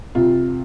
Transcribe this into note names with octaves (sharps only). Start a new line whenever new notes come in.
C3 F4